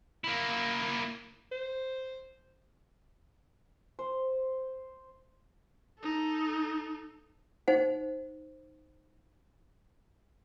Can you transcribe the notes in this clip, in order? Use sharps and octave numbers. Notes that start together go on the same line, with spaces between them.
A#3 E4
C5
C5
D#4 A4
D#4 C5 F#5